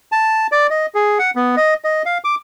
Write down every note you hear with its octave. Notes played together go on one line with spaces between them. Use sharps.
A5
D5
D#5
G#4
F#5
B3
D#5
D#5
F5
D6